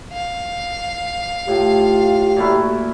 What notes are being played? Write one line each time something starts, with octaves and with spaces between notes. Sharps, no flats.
F5
A2 F4 G4
A#2 A3 E4 F#4